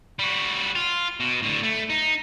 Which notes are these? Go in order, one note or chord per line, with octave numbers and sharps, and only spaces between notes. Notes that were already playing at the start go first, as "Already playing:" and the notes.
G3 F#4
F4
B2
A2 D3
A3
D#4